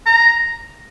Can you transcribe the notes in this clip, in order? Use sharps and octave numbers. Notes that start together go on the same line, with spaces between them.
A#5